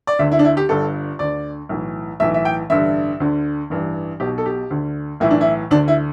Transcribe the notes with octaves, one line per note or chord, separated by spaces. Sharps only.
D5
D2 D3 E5
E4
D4
E4
G4
G1 G2 D3 A4
D2 D3 D5
B1 A2 E3
B1 A2 E3 E5
E5
G5
A1 G2 D3 E5
D2 D3
A1 G2 E3
B1 B2 G4
A4
G4
D2 D3
B1 A2 E3 E4
D4
E4
D2 D3 D4
E4